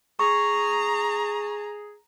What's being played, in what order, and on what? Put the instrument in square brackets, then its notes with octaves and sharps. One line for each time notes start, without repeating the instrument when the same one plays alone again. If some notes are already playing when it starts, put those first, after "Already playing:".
[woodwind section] G#4 [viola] A#5 [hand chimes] C#6